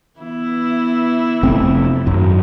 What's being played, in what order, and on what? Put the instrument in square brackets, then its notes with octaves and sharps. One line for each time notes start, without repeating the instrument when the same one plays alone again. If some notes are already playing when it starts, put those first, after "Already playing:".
[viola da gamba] E3 B3 E4
[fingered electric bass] F1 A3 C4
G#1 F#2 F#3